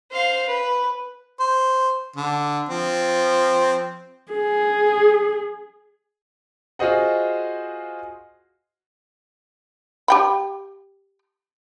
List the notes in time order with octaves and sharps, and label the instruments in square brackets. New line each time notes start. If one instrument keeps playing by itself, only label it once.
[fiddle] C5 F5
B4
[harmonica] C5
D3
F3 C4
[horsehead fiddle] G#4
[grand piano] F4 F#4 G#4 C5 D#5 F#5
[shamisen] G4 G5 B5